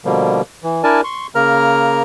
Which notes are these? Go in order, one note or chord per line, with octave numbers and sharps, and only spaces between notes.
B2 D3 F3 G3 A#3
E3
D4 E4 A#4 D5 G#5 A5
C6 C#6
C#3 A#3 A#4 A#5 F6